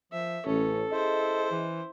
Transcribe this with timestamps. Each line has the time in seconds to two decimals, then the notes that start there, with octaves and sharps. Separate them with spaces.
0.12 F3 E5
0.46 A1 C#4 A4
0.91 E4 G#4 C5 D#5
1.51 E3